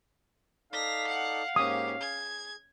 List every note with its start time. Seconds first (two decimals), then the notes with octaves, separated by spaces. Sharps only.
0.73 D#4 A4 D5 F5 A#6 B6
1.06 F#5
1.56 G#2 A#3 C#4 G4 D#6
2.01 G#4 G#6